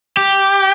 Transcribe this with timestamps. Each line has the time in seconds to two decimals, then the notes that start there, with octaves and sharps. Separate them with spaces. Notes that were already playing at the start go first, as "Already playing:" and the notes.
0.17 G4